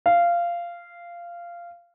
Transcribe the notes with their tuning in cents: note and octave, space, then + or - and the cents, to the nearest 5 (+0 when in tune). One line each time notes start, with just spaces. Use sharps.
F5 -15